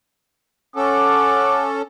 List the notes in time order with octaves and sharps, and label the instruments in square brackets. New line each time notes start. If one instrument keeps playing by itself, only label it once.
[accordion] C#4 A4 [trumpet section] F#5 D6